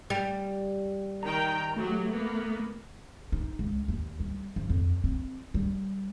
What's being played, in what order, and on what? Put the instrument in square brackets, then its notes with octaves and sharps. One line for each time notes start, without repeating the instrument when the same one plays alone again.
[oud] G3
[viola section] D#3 G5 [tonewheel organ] A#5
[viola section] F#3 G4 [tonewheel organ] A3
[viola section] A#3 B3
[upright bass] D#4
C#2
D#2
G3
F3
F2
C4
G3